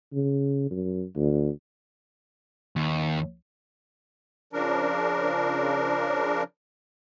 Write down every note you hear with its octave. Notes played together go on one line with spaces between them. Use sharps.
C#3
F#2
D2
D#2
C#3 F3 D4 A#4